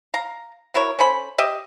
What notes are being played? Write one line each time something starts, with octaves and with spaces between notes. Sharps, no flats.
F5 A#5
F#3 E4 A#4 C#5
C#4 A4 C5 B5
G4 D#5 E5